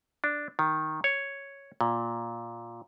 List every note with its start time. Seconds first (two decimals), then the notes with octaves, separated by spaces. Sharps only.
0.24 D4
0.59 D#3
1.04 C#5
1.81 A#2